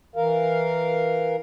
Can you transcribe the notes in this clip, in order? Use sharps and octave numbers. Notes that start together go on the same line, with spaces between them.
E3 A#4 F5